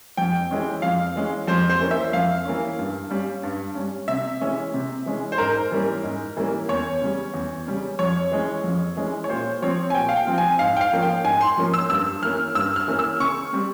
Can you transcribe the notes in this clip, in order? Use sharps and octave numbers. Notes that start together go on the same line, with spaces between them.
F2 G5
E3 G#3 C#4
F2 F5
E3 G#3 C#4
F2 C5
C5
E3 A#3 C#4
E5
F2 F5
E3 A#3 C#4
G2
G3 C#4
G2
G3 C#4
C3 E5
E3 G#3 C#4
C3
E3 G#3 C#4
C5
G#2 A#4
E3 G3 A#3 C#4
G#2
E3 G3 A#3 C#4
E2 C#5
C#3 G3 C#4
E2
C#3 G3 C#4
F2 C#5
E3 G#3 C#4
F2
E3 G#3 C#4
C#5
A#2 C5
F3 C4 C#5
G#5
A#2 G5
F5
G5
F3 C4
G#5
G#2 F5
G5
F5
F3 A#3 C#4
G5
G#2 G#5
C6
F3 A#3 C#4
E6
G2 E6
E3 A#3 C#4 F6
G2 E6
F6
E3 A#3 C#4
E6
C#3 C#6
G3 C4